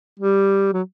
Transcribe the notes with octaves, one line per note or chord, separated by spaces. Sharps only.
G3
F#3